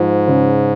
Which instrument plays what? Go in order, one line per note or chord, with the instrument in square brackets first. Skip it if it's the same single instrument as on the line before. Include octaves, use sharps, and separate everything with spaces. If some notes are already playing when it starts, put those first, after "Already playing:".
Already playing: [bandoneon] G#2 [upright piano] F3
[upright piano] C#3